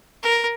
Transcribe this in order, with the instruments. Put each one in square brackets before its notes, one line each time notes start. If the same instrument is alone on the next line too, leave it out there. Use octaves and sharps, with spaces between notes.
[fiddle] A#4